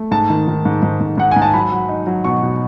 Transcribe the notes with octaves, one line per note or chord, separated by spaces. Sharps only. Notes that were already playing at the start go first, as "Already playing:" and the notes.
Already playing: A3
G#2 A5
D#3
D#3
G#2
G#2
G#2
G#2 F#5
G#5
G#2
A5
F#3 B5
F#3
D#4
F#3
B2 C#6
B2